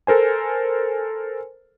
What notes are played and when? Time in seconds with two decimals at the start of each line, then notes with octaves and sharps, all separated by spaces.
0.07 A4 A#4 C5 G#5